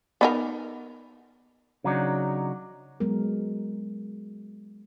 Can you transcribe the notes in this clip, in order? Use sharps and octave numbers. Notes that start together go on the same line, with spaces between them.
B3 D#4 A#4
C#3 F#3 D4 D#4
F#3 G#3 B3 A#4